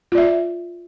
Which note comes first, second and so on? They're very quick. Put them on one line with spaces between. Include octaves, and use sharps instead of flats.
F4 D5 E5